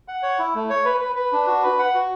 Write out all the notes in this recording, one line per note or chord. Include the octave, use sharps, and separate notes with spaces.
F#5
C#5
E4
A3
C#5
B4
B4
B4
D4
F#4
B4
F#5
F#4